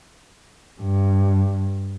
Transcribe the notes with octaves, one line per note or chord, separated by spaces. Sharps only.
G2